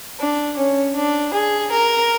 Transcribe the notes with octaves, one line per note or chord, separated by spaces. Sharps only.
D4
C#4
D4
G#4
A#4